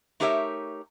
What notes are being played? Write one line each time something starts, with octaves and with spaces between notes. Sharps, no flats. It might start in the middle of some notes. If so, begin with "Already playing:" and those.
A3 D#4 G4 A#4 C#5 E5